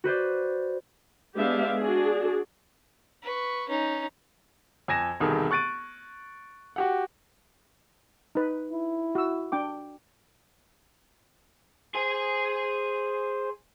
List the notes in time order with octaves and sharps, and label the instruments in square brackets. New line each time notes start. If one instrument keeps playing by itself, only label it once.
[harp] F#4 B4 C5 D5
[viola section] G#3 B3 D4 G4 E5 F5
D4 F#4 G#4
[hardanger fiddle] B4 C#6
C#4 D#4
[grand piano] F2 G#5 G#6 A#6 E7
E1 C2 D#3 G#4 A4
C#6 F#6 A6 D7 D#7
F#4 G4 F#5
[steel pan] D#4 B4
[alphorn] E4
[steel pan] F#4 E6
D4 G5 D6
[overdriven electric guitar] G#4 G#5 [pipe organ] C5